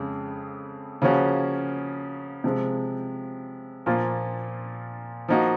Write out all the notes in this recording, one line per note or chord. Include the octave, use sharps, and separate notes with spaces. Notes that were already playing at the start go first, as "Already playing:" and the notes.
Already playing: F2 C#3 G#3
C#3 F3 A#3 C#4 F#4
C3 F3 G#3 C4
A#2 F3 A#3 F4
F3 A#3 D#4 F#4